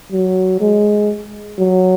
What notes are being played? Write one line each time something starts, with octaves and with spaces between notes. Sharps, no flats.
F#3
G#3
F#3